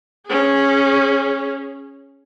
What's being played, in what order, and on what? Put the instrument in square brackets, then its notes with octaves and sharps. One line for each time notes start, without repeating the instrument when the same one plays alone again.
[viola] C#4 G#4